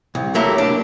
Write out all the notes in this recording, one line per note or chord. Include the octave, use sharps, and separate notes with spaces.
C2
F#3 A3 A#3 E4 G4
D4